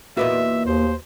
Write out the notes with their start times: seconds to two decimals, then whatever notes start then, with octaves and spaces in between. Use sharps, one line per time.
0.17 E2 A#2 A#3 F#4 B4 D#5 E5
0.66 D#2 C5